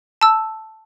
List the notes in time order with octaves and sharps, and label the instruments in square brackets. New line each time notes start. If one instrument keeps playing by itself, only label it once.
[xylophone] A5 E6